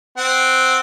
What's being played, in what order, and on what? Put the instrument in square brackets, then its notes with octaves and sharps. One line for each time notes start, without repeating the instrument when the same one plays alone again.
[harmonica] C4 F#5